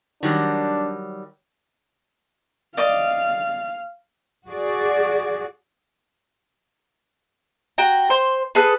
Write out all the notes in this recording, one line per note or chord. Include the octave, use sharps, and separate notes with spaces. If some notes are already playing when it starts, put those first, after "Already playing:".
D#3 F#3 G3 D4
D5 D#5 F5 D6
F#4 G#4 D5
F#4 G5 A#5
C5 C6
G#4 A4 B4 F#6